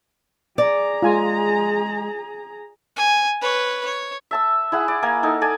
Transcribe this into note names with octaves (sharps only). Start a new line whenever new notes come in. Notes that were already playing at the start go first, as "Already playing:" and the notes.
G#4 D5 A#5
G#3 F4 G#5
G#5
B4 C#5
C#5
E5 A5 E6
E4 G#4 F#5
D5
A#3 A#4 G#5
D#4 A4
A4 D5 G#5